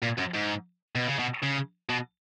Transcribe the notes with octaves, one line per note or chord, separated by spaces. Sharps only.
A#2
F#2
G#2
B2
C#3
B2
C#3
B2